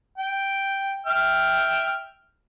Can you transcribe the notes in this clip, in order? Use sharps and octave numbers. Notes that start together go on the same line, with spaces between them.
G5
E5 G5 F6